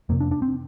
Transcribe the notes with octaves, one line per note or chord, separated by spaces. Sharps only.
F2 C3 A#3
D4
D4
C4